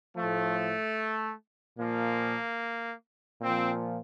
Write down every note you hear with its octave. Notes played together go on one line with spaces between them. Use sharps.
A2 F3 A3
A#2 F3 A#3
A#2 F3 C4